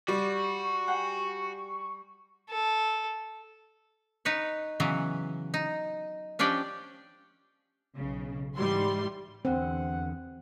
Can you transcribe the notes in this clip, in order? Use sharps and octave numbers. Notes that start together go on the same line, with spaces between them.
G3 F#4 D5 C#6
G#4 F#5 G5
A4
D#4 B4 C#5
C#3 E3 F#3 B3
D#4
F3 C#4 D4 G4 D5 G5
B1 C#3
G#2 E3 G3 C6
E2 D3 C4 F#5